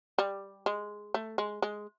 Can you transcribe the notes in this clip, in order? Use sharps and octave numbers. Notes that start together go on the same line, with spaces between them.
G3
G#3
A3
G#3
G#3